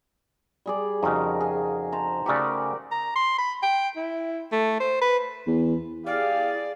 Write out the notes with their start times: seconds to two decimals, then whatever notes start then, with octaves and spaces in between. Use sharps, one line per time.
0.66 G3 G#4 D5
1.03 F2 C#3 D#4 F#4 A#4
1.40 G#4
1.92 C5 A5 A#5
2.26 C#3 A3 F#4 G4 A#4 D5
2.91 A#5
3.16 C6
3.38 B5
3.63 G5
3.96 E4
4.52 A3
4.80 C5
5.01 B4
5.47 E2
6.06 E4 G4 G#4 D5 F5